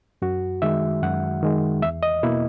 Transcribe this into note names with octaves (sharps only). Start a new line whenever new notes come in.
F#2 F#4
D#3 G#3 E5
F#2 F#5
D#3 G#3
E2 E5
D#5
B2 A#3 E4